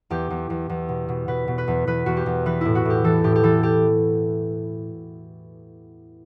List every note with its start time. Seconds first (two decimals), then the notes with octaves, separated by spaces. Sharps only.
0.10 E2 G4
0.30 E2
0.50 E2
0.69 E2
0.89 B2
1.09 B2
1.28 B2 B4
1.48 B2
1.58 B4
1.68 E2
1.87 E2 B4
2.06 E2 F#4
2.16 G4
2.26 E2
2.46 E3 B4
2.61 A2 E4
2.75 F#4
2.85 A2 G4
3.04 E3 A4
3.24 A2 G4
3.35 G4
3.43 E3 A4
3.63 G4